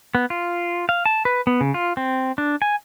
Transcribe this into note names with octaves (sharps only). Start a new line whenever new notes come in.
B3
F4
F5
A5
B4
B3
C#3
F4
C4
D4
G#5